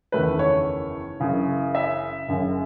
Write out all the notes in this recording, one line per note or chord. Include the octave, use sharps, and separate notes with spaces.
F#1 E2 D#3 A3 B4
C#5
F#1 F#2 C#3 E3
E5
F#1 F#2 C#3